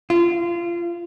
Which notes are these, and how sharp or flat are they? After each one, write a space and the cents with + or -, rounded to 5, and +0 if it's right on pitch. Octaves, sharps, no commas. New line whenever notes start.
F4 -25